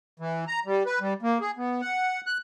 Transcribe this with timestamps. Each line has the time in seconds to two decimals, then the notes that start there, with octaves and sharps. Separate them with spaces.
0.19 E3
0.47 A#5
0.66 G3
0.86 B4
1.00 G3
1.22 A#3
1.41 G#4
1.57 B3
1.81 F#5
2.26 F#6